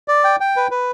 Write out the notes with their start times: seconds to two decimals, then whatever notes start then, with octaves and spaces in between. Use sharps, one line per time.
0.08 D5
0.24 G5
0.40 G5
0.56 B4
0.71 B4